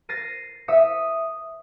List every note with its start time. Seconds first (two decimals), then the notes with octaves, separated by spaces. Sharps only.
0.09 A6 A#6 C7 D#7
0.68 E5 D#6 C#7